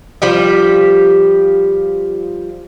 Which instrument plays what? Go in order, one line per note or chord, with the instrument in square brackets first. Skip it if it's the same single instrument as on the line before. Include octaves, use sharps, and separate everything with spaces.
[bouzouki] F3 G3 G4